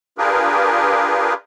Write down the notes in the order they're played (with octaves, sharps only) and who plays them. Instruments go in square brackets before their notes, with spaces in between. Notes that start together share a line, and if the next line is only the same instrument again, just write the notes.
[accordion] D4 F4 G4 G#4 A#4 B4